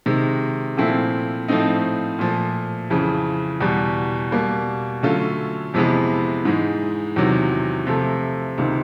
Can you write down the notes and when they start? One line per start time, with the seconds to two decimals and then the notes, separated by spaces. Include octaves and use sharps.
0.06 C3 D#3 G#3
0.77 A#2 F3 A3 C4 E4
1.48 A2 F3 A3 C4 D#4
2.19 A#2 F3 A3
2.90 F2 C#3 E3
3.61 E2 B2 G3
4.32 B2 G3 A#3
5.03 D3 F#3 A3 C#4 F4
5.74 F2 C3 E3 G#3 B3
6.45 G#2 E3 G#3
7.16 E2 C3 D#3 F#3
7.87 C3 F3 A3
8.58 C#2 C3 D#3